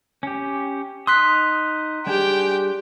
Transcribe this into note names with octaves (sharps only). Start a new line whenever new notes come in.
C#4 G4
D#4 C6 D#6 F#6 B6
G3 D4 G4 G#4 G5